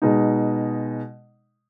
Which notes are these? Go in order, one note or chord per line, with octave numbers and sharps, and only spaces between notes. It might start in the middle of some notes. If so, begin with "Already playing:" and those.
B2 G#3 D#4